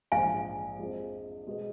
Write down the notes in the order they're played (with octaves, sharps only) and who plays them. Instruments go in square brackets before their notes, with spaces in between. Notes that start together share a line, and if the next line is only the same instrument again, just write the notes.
[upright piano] A#1 G#2 F3 [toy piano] F5 G#5
[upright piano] F2 F3 G#3
B2 G#3 B3